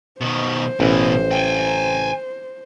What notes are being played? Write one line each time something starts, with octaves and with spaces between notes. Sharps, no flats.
B2 D#3 C5
A1 B2 E3
G5 G#5